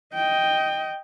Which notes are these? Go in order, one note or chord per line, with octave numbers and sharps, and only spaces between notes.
D#5 G5